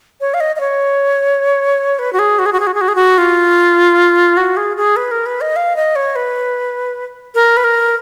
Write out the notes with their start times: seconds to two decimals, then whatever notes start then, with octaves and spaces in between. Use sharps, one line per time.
0.21 C#5
0.34 F5
0.40 D#5
0.56 D#5
0.60 C#5
1.99 B4
2.13 F#4
2.19 G#4
2.39 F#4
2.46 G#4
2.53 F#4
2.60 G#4
2.67 F#4
2.74 G#4
2.81 F#4
2.88 G#4
2.95 F#4
3.18 F4
4.37 F#4
4.57 G#4
4.77 G#4
4.96 B4
5.11 A#4
5.26 B4
5.41 D#5
5.56 F5
5.76 D#5
5.96 C#5
6.16 B4
7.35 A#4
7.57 B4
7.64 A#4